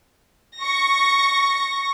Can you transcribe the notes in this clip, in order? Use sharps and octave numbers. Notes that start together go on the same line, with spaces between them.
C#6 A#6